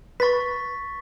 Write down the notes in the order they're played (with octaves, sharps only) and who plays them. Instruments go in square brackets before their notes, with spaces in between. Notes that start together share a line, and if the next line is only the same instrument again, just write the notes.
[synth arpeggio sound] B4 B5 [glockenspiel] C#6 A6 B6